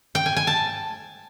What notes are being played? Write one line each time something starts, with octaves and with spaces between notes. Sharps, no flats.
G5
G#5
G#5
A5